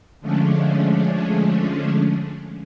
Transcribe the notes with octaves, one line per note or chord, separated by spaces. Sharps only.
D3 F3 G#3 A3 C#4 D4